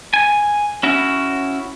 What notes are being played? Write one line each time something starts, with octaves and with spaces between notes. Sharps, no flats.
G#5
C#4 E4 F#4